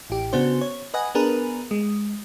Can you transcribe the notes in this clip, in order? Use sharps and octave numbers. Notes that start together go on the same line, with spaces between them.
A1 G4
C#3 B3 D4 F#4 C5
C#5
B4 D#5 F#5 G#5
B3 D4 G#4 A#4 B4
G#3